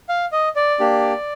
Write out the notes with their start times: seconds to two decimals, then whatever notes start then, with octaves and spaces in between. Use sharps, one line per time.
0.09 F5
0.32 D#5
0.56 D5
0.80 A#3 D4 G4